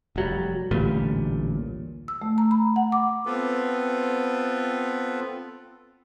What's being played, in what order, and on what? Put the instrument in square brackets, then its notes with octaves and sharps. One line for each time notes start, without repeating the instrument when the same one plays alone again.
[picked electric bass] F1 F#3 G3
A1 D2 A#2 G3
[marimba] E6
A3
A#5
B5
F#5
D6
[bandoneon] B3 C4 F4 A4 B4